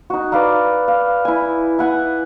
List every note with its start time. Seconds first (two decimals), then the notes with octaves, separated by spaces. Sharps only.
0.10 D#4 F#4
0.32 B4 D5 F5 A#5
0.88 F5
1.25 E4 G#5
1.79 E4 F#5 G#5